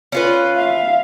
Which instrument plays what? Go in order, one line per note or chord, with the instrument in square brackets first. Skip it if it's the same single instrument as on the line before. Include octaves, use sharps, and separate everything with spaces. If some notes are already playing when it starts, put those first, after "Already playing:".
[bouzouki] C#4 F4 B4
[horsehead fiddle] E5 F5